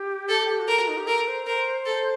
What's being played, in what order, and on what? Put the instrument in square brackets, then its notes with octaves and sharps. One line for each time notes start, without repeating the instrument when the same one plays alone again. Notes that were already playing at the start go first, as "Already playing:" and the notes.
Already playing: [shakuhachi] G4
[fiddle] A4
[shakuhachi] F#4
[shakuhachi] G4 [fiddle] A#4
[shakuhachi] F#4
D#4
G4
[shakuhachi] A4 [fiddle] A#4
[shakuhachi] C5
[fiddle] A#4 [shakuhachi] C5
[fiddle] A4